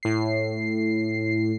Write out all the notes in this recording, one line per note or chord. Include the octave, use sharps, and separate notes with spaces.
A2 C7